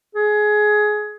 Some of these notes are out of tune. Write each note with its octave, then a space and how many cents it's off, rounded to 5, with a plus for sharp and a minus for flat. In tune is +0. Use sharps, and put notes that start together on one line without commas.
G#4 +20